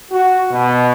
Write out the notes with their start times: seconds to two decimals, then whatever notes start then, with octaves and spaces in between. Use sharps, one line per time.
0.11 F#4
0.52 B2